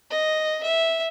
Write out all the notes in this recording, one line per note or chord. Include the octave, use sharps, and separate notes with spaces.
D#5
E5